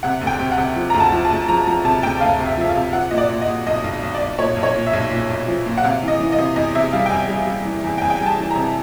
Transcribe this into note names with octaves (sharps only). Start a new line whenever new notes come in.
C3 F#5
D2
G5
C3
F#5
C3
F3
D2 A#5
A5
F3
A5
D2
F3 A#5
F3 A#5
C3 A5
D2 G5
D2 F5
C3
E5
F3 E5
F5
C3
F3 F#5
A#2 D#5
D5
A#2
D#5
A#2
B1 D#5
B1
B1
D5
B1
A#2 C#5
B1
C#5
A#2
E5
B1
A#2
B1
F3
A#2
F#5
C3 F5
E3
D#5
E3
D#5
C3
E2 D#5
C3 E5
G3 F5
G5
E2 G#5
G3
G3
E3
E2
G5
E2 G#5
G5
G3 G#5
A5
E3
A#5
C3